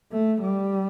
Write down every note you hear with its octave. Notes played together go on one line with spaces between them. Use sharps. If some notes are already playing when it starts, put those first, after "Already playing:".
A3
G3